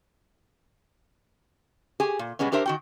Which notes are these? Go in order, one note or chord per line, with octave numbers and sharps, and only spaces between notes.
G4 G#4 G#5
A#2
B2 G3 G#3 B3 C#4
D4 G4 A#4 C5 E5
D#3 F#4 G5